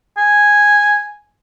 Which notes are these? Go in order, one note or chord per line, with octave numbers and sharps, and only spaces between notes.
G#5